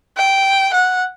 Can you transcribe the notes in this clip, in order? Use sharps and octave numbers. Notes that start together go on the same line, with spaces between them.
G5
F#5